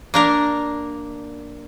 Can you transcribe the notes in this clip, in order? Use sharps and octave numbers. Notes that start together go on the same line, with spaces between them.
A#3 D4 A#4